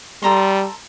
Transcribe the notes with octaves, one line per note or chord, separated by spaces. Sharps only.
G3 A4 A#5 C6